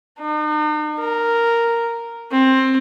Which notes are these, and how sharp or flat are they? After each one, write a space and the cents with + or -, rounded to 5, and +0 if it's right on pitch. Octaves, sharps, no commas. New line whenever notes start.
D#4 -45
A#4 -5
C4 +15